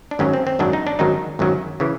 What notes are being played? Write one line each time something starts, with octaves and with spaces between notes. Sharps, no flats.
D4
G#1 F#2 D#3 F#3 C#4
C4
C4
G#1 F#2 D#3 F#3 D4
D#4
D4
G#1 F#2 D#3 F#3 D#4
G#1 F#2 D#3 F#3
C#3 E3